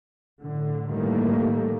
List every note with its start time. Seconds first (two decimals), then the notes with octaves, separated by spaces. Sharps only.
0.43 A2 D3
0.89 A2 D#3 E3 G3 A3 A#3